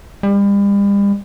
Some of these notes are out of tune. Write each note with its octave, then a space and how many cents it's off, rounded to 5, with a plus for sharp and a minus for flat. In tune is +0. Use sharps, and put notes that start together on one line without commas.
G3 +40